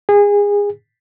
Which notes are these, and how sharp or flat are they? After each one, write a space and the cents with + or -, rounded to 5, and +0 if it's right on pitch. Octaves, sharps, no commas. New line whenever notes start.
G#4 -25